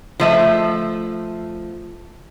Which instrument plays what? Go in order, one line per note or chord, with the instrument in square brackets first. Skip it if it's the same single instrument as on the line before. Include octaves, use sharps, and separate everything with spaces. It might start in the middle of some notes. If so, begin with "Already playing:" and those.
[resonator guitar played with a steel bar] F3 A3 E5